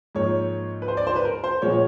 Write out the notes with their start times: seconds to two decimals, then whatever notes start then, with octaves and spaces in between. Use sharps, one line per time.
0.15 G#2 F3 A#3 C#5
0.82 B4
0.88 C5
0.97 D5
1.07 C5
1.16 B4
1.25 A#4
1.44 C5
1.62 A#2 F3 G#3 B3 C#5
1.72 C#5